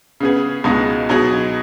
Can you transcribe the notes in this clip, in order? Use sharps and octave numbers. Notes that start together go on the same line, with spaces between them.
C#3 B3 G#4
C#2 B2 G#3 D#4 G#4
B2 F#3 D#4 G#4